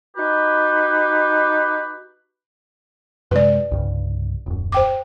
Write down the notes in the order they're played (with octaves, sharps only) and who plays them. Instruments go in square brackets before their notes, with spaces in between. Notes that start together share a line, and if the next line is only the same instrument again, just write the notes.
[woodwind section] D#4 F#4 G4 B4
[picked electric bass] F#2 C3 G#3 [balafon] B4 D5
[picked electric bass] C2 G2 C#3
D#1 F#2
[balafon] C5 G5 D6